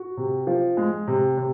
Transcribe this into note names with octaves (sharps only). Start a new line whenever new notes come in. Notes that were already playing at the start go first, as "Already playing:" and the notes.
Already playing: F#4
C3
F3
G#3
C3
C3